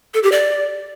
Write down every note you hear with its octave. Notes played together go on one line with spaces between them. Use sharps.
A4
G4
D5